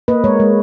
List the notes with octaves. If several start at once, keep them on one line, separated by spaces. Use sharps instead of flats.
A#3 B4 D#5
G#3 A#4 C#5
G#3